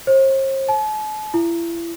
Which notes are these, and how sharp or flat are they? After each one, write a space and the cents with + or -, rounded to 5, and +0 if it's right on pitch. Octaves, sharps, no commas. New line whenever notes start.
C5 +45
A5 -45
E4 +35